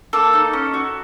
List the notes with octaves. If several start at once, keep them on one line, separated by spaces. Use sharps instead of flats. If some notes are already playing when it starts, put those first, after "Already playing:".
A#3 A4
D#4
C#4
F#4